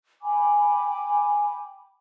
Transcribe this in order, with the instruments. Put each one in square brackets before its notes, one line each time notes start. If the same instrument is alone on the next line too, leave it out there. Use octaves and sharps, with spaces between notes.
[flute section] G5 G#5 B5 D6